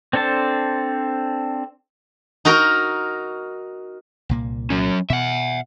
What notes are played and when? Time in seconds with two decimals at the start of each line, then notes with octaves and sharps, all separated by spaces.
0.13 C4 D4 A4 C5 A5
2.45 D#4 F#4 A#4
4.29 C2 A#2 A#3
4.70 F#3 C#4
5.10 B2 E5 F#5